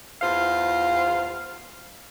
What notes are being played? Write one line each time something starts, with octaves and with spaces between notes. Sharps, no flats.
E2 F4 C5 F5